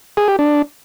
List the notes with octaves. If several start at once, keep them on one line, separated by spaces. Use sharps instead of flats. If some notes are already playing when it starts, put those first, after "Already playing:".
G#4
G4
D4